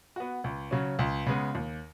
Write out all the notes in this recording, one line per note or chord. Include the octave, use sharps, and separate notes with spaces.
B3 F#4
C#2
C#3 F#3 C#4
C#2
C#3 G#3 B3
D#2